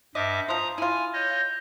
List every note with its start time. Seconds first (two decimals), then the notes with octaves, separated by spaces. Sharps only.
0.15 G2 D#5 E5 D6
0.48 F3 C5 A#5 D#6
0.78 E4 F4 G#5
1.13 C#5 D#5 G6